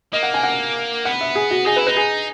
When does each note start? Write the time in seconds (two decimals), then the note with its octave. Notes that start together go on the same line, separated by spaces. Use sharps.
0.13 A#3 D#5
0.23 F#5
0.34 G#5
0.43 F#5
1.05 B3 F#5
1.21 E5
1.35 G#4
1.51 F#4
1.66 D#4 G#4
1.76 E4 B4
1.87 D#4 B4
1.97 G#4